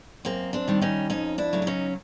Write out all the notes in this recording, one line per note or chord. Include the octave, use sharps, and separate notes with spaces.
F#2 A#3 C4
C4 D4
D#3 G3
C#4 D#4
F2 C#4 D#4
D4 E4
C#3 F#3 A3
E4
C#4 D#4